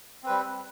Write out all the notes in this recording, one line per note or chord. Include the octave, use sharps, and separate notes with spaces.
G3 C4 B4